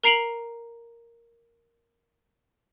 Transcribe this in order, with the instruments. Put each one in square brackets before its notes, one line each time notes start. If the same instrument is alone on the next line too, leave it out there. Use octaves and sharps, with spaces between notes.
[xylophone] A#4 A#5 C7 D7 F7 F#7